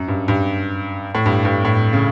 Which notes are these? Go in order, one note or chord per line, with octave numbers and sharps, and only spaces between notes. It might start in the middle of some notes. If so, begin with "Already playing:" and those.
Already playing: F#2
G2
G2
A2
G2
G2
A2
C#3